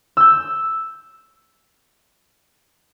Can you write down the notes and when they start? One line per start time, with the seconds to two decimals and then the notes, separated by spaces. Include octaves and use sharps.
0.17 E6 G6